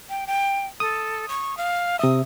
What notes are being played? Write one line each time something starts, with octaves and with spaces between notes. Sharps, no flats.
G5
G5
A4 D#6
C#6
F5
C3 E5 D#6